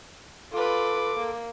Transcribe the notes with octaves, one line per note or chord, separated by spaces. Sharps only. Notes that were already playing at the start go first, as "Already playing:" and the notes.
F4 A4 B4 C6 D6
A#3